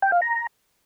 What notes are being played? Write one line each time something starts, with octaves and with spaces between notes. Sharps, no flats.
G5
F5
A#5